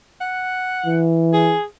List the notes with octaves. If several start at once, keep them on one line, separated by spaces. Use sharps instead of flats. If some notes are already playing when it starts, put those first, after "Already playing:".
F#5
E3
G#4